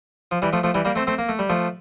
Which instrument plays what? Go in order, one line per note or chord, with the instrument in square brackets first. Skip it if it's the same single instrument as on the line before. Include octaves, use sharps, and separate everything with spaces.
[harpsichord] F3
E3 G3
F3 A3
F3 A3
E3 G3
G3 A#3
A3 C4
A3 C4
A#3
A3
G3
F3 A3